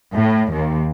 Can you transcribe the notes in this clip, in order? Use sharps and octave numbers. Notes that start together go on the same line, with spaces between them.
A2
D#2